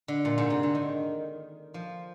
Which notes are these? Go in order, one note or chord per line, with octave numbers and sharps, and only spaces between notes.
D3
A#2
G#2
C3
D3
D#3
F3